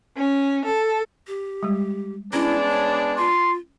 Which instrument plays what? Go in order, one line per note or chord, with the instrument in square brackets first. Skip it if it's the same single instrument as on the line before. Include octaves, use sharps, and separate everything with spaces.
[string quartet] C#4
A4
[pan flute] G4
[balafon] G3 G#3
[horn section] G#3 B3 D4 [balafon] C#4 [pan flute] E4
[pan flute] C#5
[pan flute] F4 [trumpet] C6